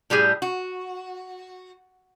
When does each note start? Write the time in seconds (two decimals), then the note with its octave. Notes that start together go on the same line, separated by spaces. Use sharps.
0.10 A2 G3 G4 G#4
0.42 F#4